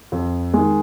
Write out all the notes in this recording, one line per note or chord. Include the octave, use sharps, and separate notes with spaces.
F2
D#3 G#3